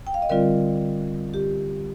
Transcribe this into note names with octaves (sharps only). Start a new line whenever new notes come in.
G5
F5
D#5
D3 G3 C4 F4 A#4 D5
G4